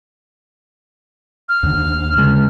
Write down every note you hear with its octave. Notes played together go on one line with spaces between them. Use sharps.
F6
D#2 D3
C#3 G#3